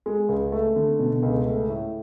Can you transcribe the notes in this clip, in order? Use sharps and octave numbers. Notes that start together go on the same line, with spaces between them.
G#3
C#2
A3
D3
B2
C#2
A3
A2